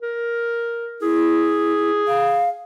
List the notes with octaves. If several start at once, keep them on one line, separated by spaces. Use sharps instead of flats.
A#4
E4 G#4
F5